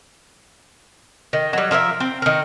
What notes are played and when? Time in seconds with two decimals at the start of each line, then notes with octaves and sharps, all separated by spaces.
1.33 D#3
1.53 F#3 G3
1.71 F3 A#4 D#5 E5
2.00 C4
2.22 D#3 A#4